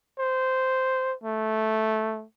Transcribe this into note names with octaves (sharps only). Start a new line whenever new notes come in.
C5
A3